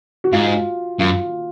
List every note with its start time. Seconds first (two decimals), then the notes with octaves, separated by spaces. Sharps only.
0.24 F#4
0.33 G#2 F4
0.99 F#2 F4